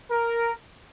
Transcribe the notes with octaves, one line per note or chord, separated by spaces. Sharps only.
A#4